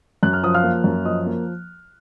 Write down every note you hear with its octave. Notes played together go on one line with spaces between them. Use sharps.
F#2 F#6
F6
F3 D#6
F5 F6
A#3
F#2
F3 D#5 D#6
A#3